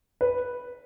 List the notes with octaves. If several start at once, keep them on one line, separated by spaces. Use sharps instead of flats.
B4